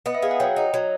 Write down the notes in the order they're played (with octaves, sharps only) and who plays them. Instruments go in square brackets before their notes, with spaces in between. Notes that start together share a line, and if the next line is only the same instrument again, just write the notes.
[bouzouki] B3 [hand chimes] D#5
[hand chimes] E5
[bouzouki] G#4 [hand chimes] F5
[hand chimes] F#5
[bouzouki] F#3 [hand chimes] G5
[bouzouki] D#4
F#3